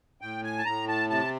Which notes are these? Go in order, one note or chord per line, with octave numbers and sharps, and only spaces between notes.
A2 G5
G#5
A5
A2 A#5
A5
C3 A5